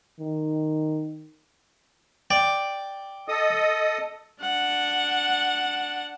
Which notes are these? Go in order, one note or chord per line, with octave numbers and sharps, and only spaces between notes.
D#3
D5 G5
A4 D#5 D#6
D4 F#5